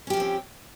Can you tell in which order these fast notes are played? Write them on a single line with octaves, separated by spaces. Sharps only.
C#4 G4 F3 A3 C4